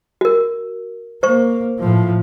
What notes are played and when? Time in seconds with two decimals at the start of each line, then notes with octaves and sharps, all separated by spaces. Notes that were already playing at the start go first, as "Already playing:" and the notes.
0.21 F#4 A#4
1.23 A#3 C5 C#6
1.80 A2 F3